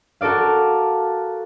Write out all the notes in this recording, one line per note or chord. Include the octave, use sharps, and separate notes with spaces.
F#4 A4 A#4 D5 F5